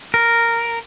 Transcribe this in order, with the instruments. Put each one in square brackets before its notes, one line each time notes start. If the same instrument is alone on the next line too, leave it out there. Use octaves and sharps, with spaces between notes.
[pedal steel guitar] A#4